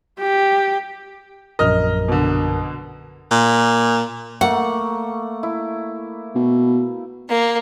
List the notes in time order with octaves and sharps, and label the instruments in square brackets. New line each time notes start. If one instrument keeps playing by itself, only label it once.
[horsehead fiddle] G4
[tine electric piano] A#1 F#2 A#4 [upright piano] D#5 F6
[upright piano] B2 D3
[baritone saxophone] A#2
[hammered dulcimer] A3 A#3 [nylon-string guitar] F#5
[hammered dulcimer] E4
[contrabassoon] B2
[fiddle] A#3